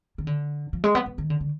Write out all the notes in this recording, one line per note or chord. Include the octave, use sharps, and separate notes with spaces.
D#3
D3
F3
G#3
B3
B3
D#3
D3
D3